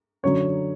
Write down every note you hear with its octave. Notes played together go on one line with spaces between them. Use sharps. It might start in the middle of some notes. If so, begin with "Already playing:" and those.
F#2 D3 F#3 C#5